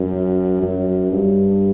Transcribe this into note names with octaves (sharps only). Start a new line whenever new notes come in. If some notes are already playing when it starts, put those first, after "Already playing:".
Already playing: F#2
F#2
G2